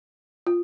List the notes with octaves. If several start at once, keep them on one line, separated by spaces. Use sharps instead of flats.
F4